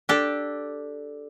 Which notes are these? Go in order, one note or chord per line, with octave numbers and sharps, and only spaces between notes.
D4 G4 A4